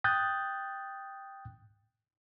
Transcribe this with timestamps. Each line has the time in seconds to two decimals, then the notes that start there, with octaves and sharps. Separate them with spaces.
0.04 G5 D#6 F#6 G6 A6